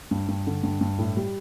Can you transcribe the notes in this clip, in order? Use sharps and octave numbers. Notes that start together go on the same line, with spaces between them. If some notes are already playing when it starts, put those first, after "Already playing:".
G2
G2
D3
G2
G2
A2
G3